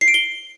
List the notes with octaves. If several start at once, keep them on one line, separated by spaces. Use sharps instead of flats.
C7
D7
G7